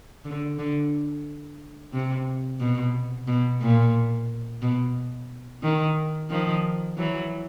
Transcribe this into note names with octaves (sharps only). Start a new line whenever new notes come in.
D3
D3
C3
B2
B2
A#2
B2
D#3
D#3 F3
E3 F#3